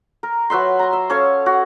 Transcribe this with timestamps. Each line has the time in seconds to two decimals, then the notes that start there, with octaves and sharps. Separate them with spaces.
0.23 A#4
0.50 F#3 B4 E5 C6
0.79 A#5 C6
0.93 E5
1.10 C#4 A4 C#5 F5
1.46 F#4